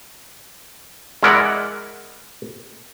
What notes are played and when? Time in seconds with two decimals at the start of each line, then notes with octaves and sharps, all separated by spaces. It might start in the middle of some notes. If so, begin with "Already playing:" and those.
1.23 G#3 E4 A#4 D5 F#5